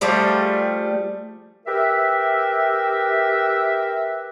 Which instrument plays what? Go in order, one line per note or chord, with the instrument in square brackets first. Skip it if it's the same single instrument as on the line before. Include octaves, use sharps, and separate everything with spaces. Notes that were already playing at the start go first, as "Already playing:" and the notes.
[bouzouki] F3 G3 A3 G#4
[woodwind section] G4 A#4 B4 E5